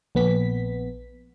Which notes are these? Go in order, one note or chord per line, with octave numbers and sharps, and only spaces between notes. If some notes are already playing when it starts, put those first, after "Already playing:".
A#1 B3 B6